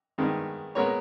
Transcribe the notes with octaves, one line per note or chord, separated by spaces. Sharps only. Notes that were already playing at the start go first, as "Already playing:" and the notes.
G2 D#3 G#3 B3
A#2 G#3 B3 A#4 C#5